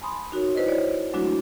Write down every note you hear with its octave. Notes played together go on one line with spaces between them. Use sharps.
G#5 A5 B5 C6 D#6
D#4 F#4 A#4 C#5
E4 B4 C5 D5 D#5
C#5 D5
F#3 G#3 A3 D4 E4 F#4